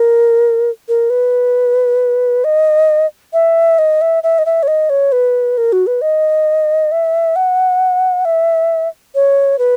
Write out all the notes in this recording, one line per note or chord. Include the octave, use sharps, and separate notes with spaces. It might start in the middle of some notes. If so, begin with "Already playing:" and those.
Already playing: A#4
A#4
B4
D#5
E5
D#5
E5
E5
D#5
E5
C#5
D#5
C#5
B4
A#4
F#4
B4
D#5
E5
F#5
E5
C#5
B4